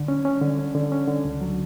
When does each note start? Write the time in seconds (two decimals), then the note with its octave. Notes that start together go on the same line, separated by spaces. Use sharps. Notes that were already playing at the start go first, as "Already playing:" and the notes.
Already playing: D3
0.08 C#4
0.25 C#4
0.41 D3
0.59 C#4
0.75 D3
0.92 C#4
1.08 D3
1.25 C#2
1.41 F#3